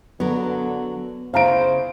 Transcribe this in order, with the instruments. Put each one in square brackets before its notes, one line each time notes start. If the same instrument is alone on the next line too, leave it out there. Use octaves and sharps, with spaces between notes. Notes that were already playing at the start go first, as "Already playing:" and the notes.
[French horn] D3 [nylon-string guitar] F#3 A#4 [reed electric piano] B3
[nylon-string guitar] C#3 E4 [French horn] C5 [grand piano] F5 A#5 D7